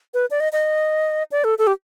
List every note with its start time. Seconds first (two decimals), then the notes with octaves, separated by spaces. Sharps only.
0.14 B4
0.30 D5
0.40 D#5
0.53 D#5
1.31 D5
1.44 A4
1.58 A4
1.67 G4